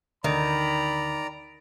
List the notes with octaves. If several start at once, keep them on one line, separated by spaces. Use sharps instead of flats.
D2 D3 D#3 D5 A#5 B5